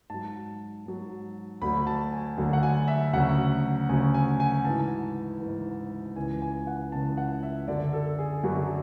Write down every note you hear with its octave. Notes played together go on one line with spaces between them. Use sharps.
G#2 F#3 A5
G#2 F#3
D2 D3 F#3 B5
A5
G#5
D2 D3 F#3
F#5
G#5
E5
D2 C#3 F#3 F#5
D2 C#3 F#3 G#5
G#5
G#5
G#2 E3 A5
G#2 E3
C#2 C#3 E3 G#5
G#5
F#5
C#2 C#3 E3 A5
F#5
E5
F#2 D3 F#3 D5
A4
G#4
F#2 D3 F#3 F#4